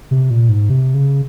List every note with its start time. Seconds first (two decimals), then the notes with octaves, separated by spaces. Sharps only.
0.11 C3
0.30 A#2
0.49 G#2
0.70 C3
0.94 C#3